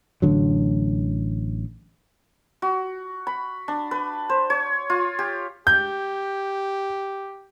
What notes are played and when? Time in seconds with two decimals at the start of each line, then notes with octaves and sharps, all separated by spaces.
0.22 A1 D3 F#3
2.62 F#4
3.27 B5
3.68 D4
3.91 B4
4.29 C5
4.50 C#5
4.90 F4
5.19 G4
5.67 G4 G6